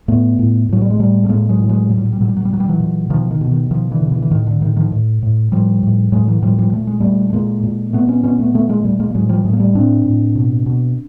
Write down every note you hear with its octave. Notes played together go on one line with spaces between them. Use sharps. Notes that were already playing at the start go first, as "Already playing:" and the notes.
A2 A3 B3
A2
A2 F#3
G3
G#3
A2 G3 A3
A3
A2 G#3 A#3
F#3 G#3
A2
F#3 G#3
A#2 F#3
G3
F#3
G3
A#2 F#3
G3
F#3
G3
A#2 F#3
G3
E3 F#3
A#2
B2 D#3 F3
D#3
B2
D#3
B2 D#3 F3
D3 E3
B2
D3 E3
E3
A2 D#3
D3
A2 D#3
D#3 F3
A2
A2
A2 F3 G3
A2
A2 F#3 G#3
E3 F#3
A2 F3 G3
F3 G3
A#2 A3
G#3
A#2 G3 A3
A3
A#2 G#3 A#3
A#2
A#2 A3 B3
B3 C#4
A#2 B3 C#4
A3 B3
A#2 A3 B3
G#3 A#3
A#2 G3 A3
G#3 A#3
G3
A2 F#3 G#3
F3 G3
A2 F#3 G#3
A#3
G3 A3
A2 C4 D4
A2
B2
B2